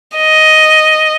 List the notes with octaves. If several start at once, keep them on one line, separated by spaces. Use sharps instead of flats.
D#5